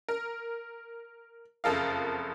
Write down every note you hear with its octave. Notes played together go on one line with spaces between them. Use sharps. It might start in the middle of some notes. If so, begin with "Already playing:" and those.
A#4
F#1 F2 A4 A#4 F5